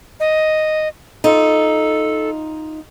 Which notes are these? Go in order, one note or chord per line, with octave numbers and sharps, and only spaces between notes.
D#5
D#4 F4 A4